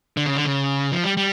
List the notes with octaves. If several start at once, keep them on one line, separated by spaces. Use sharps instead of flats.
D3
C#3
D3
C#3
F3
G3
G3